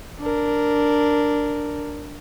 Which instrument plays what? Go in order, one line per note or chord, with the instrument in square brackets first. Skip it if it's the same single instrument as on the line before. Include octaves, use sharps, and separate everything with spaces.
[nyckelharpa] D4 A#4